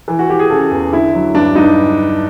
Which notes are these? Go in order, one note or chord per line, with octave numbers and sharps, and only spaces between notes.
E3
F#4
E3 G4
G#4
C#3 A4
E2
D3 E4
F#3
G2 D4
G2 D#4